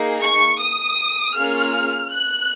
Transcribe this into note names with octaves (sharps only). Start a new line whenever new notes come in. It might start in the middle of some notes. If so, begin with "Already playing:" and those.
Already playing: A#3 D#4 G#4
C#6
D#6
A#3 C#4 F4 G#4 F6
F#6